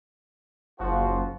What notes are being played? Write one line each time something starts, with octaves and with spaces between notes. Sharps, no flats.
F#1 F3 F4 F#4